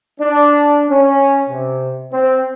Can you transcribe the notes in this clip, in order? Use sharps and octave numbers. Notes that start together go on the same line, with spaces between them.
D4
C#4
C3
C4